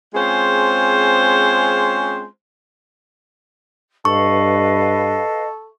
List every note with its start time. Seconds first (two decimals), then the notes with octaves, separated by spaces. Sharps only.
0.14 G#3 C4 C#4 F4 G#4 C5
4.05 G2 A4 B4 D#5 F5 C#6